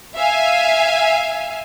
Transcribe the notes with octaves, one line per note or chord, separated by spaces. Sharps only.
E5 F5 G#5